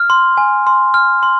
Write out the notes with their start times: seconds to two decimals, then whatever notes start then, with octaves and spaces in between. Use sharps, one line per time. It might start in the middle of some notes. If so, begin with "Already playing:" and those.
Already playing: F6
0.10 C6
0.37 G#5
0.67 C6
0.94 F6
1.23 C6